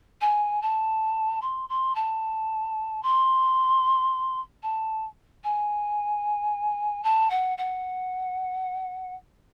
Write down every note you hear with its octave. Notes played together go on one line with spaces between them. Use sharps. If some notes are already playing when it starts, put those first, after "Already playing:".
G#5
A5
C6
C6
A5
C6
A5
G#5
A5
F#5
F#5